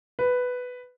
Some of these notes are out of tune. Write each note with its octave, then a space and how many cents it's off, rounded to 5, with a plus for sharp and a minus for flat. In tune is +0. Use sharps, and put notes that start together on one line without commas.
B4 +5